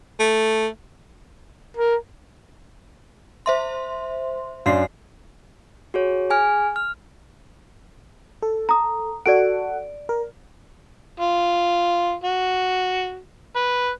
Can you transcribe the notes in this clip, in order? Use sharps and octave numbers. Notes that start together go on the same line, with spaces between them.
A3
A#4
C5 E5 C6
F#2 D4 F5 C6 C7
F#4 G#4 C#5
G#4 G#5 F6
F6
A4
A#5 D#6
F#4 A4 D5 F#5 D7
A#4
F4
F#4
B4